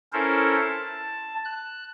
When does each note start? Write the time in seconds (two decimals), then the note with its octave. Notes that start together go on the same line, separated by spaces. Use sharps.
0.13 C#4 E4 A4 A#4 C5
0.60 A5
1.45 F#6